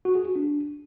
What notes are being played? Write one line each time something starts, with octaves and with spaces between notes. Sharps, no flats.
F#4
G#4
F#4
D4